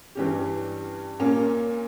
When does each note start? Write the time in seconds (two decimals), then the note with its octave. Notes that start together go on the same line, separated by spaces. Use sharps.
0.15 G2 E3 G3 C#4 G4
1.20 A#2 A#3 C#4